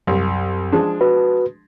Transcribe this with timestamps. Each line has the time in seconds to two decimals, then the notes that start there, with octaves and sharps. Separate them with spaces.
0.07 C2 F#2
0.72 F3 G#3 D4
1.01 F#4 B4